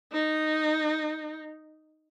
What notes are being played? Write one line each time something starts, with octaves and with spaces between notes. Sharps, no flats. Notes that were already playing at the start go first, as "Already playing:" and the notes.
D#4